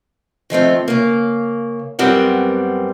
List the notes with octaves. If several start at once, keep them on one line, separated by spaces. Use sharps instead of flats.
D#3 F3 A3 C4
C#3 A#3
F#2 G3 B3 C4 A#4 F#5